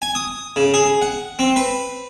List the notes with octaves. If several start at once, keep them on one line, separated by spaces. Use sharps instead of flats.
G#5
D#6
C#3
G#4
F#5
C4
B4